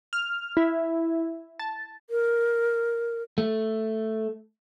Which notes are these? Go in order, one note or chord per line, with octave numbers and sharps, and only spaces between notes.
F6
E4
A5
A#4
A3